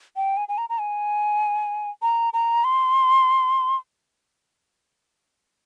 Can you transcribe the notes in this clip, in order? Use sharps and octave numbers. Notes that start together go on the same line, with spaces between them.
G5
G#5
G#5
A#5
A#5
G#5
A#5
A#5
C6